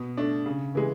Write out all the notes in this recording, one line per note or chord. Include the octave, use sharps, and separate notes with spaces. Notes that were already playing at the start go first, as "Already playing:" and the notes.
Already playing: B2
A3 D4
C#3
E3 G#3